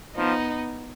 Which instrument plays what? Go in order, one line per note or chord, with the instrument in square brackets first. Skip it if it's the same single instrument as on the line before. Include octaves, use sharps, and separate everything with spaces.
[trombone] F3 [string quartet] B3 D#4